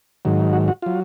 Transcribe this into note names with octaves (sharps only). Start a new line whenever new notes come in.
G#2 D#3 F#3
F#4
F#4
F#3 F4